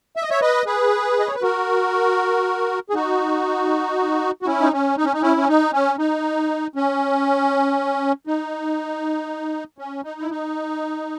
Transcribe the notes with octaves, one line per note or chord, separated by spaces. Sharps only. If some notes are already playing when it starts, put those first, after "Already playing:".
E5
D#5
C#5 E5
B4 D#5
G#4 B4
D#5
C#5
B4
F#4 A#4
G#4
D#4 F#4
F#4
C#4 E4
D#4
C#4
D#4
C#4
D#4
C#4 E4
C#4
D#4
C#4
D#4
C#4
D#4
C#4
D#4
E4
D#4